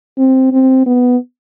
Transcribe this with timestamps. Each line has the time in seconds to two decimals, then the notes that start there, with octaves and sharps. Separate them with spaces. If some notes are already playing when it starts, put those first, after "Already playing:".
0.18 C4
0.52 C4
0.86 B3